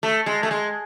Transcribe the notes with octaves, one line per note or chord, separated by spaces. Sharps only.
A3
G#3
A3
G#3